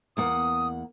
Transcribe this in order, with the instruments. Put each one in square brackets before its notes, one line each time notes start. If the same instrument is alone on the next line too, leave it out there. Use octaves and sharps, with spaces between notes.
[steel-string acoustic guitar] E2 A#3 F#5 [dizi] D#6